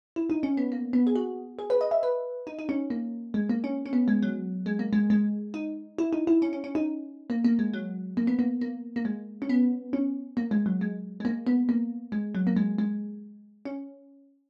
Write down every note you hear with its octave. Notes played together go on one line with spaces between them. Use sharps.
E4
D#4
C#4
B3
A#3
B3
G#4
F#4
G#4
B4
D#5
E5
B4
D#4
D#4
C#4
A#3
G#3
A#3
C#4
C#4
B3
G#3
F#3
G#3
A#3
G#3
G#3
D#4
E4
D#4
E4
C#4
C#4
C#4
D#4
A#3
A#3
G#3
F#3
A#3
B3
A#3
A#3
A#3
G#3
C#4
B3
C#4
A#3
G#3
F#3
G#3
G#3
A#3
B3
A#3
G#3
F#3
A#3
G#3
G#3
C#4